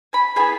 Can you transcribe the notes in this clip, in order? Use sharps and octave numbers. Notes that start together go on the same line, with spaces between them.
G#5 B5
B3 E4 G#4 G#5 B5